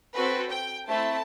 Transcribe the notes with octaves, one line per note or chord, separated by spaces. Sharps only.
C4 F#4 A4 B4
G5
A3 C4 E4 A5